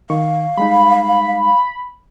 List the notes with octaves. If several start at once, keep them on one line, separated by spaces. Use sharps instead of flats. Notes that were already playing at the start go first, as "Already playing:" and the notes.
D#3 F5 C#6
G3 G#3 D#4 B5